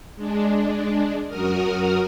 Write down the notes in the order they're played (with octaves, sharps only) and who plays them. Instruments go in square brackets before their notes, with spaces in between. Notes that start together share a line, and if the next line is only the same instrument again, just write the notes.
[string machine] G#3 D4
F#2 F#4 A#4 D#6 F6